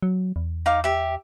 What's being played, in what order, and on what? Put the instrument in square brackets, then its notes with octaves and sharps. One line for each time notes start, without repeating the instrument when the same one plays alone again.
[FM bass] F#3
E2
[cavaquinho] D#4 F5 D6
G4 E5